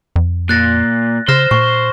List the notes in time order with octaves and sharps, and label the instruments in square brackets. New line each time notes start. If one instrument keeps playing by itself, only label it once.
[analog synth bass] F2
[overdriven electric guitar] A#2 [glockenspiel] F#6 A6 A#6
[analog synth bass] C#3 [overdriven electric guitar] C5 [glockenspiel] F6 A#6 E7
[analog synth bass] A#2 [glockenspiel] C#6